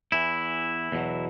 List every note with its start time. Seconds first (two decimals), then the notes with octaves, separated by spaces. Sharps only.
0.12 E2 E3 E4
0.92 E2 B2 F#3